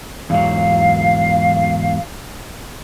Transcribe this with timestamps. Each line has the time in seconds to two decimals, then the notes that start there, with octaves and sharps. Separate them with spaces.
0.30 E2 G#2 F#3 F5